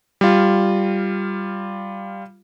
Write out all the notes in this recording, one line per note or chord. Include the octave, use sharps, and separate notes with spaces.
G3 F4